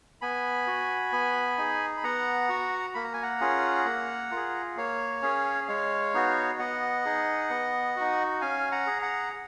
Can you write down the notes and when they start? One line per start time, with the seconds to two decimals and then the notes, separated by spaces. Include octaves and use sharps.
0.21 B3 G#5 B5
0.67 F#4
1.12 B3
1.58 D#4 G#4
1.97 B5
2.04 B3 F#5 A#5
2.49 F#4
2.94 A#3 B5
3.04 A#5
3.14 G#5
3.22 F#5 A#5
3.41 C#4 F4 G#4
3.85 A#3
4.31 F4
4.36 G#4
4.77 A#3 C#5 F5
5.22 C#4 G#4
5.68 G#3 C#5 F5
6.14 B3 D#4 F#4
6.59 B3 D#5 F#5
7.05 D#4 G#4
7.50 B3
7.96 D#4 F#4
8.41 C#4 F5 G#5
8.72 F#5 A#5
8.87 G#4
9.02 F#5 A#5